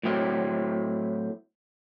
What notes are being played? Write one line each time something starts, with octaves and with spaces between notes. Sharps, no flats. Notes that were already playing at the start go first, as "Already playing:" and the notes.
A2 F#3 C4 E4